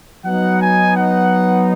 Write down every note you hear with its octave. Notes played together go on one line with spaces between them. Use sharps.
F#3 B3 D#4 F#5
G#5
F#5